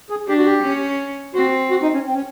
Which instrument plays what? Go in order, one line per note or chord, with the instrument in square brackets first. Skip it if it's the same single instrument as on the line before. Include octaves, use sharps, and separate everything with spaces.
[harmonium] G#4
[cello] D4 [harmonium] G4
[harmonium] F#4
G4
[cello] C#4
[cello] C4 [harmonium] F#4
[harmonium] F#4
D#4
C#4
C4
C#4